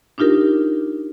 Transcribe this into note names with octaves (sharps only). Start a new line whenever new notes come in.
D4 D#4 F4 G4 A#4